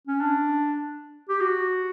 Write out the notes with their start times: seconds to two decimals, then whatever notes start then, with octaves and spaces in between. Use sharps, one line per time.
0.07 C#4
0.20 D4
1.29 G4
1.41 F#4